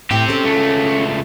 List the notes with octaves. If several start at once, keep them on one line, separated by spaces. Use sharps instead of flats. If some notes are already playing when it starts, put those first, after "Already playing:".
A2 C4 G4 G5
C#4 A4
C#2 A3